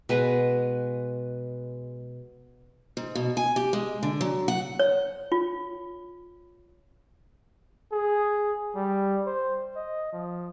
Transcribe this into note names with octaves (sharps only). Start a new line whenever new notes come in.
B2 G#3 B4
G#2
B2
G#5
G4
G#3
D3
F#3
F#5
C#5
F4
G#4
G3
C5
D#5
F3